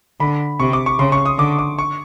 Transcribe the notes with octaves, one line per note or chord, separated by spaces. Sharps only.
D3 B5
C3 C#6
D6
C#6
C#3 C6
C#6
D#6
D3 D6
D6
C#6